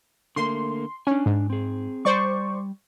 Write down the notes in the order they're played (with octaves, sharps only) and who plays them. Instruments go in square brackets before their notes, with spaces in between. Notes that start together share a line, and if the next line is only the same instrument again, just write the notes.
[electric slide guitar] D3 A3 A#3 [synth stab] C6
[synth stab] C#4 [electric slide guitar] D4 G#5
[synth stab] G#2
[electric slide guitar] C4 G#4
[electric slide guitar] G3 [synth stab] C5 D5 C#6